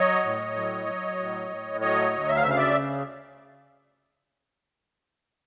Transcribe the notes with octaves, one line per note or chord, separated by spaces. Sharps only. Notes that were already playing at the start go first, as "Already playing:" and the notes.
Already playing: F#3 C#5 D#5
A2
F#3
F#3
A2
A2
F#3 C#5 D#5
D2
E5
F5
C#3 E5
F5
D5 E5